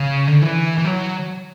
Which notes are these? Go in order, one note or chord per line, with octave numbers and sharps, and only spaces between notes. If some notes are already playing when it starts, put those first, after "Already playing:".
Already playing: C#3
D3
E3
E3
F#3